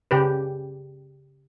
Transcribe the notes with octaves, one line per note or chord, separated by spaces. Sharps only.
C#3 G4 B4